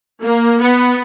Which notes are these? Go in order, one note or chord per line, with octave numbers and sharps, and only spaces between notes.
A#3
B3